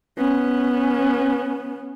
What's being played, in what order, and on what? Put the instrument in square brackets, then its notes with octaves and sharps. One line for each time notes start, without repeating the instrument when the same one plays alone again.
[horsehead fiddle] B3 C#4